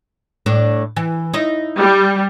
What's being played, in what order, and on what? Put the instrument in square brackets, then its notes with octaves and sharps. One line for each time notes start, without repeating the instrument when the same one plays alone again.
[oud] A2 D4
E3
D#4 E4 D#5
[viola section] G3